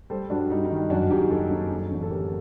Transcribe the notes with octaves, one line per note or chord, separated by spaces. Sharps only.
G3 A4 C5
G2 D4 F#4
G3 D#4
D#4
D#3
D#4
F#2 D4 F#4
F#1 D#4 G4
F#1 F#4 A4
F#1
F#3
A1
A4
D3 G4 A#4